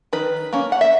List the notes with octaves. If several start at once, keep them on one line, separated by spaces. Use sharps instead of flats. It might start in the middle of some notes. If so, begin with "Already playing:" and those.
D#3 B4
A#3 C#4
F#5
E5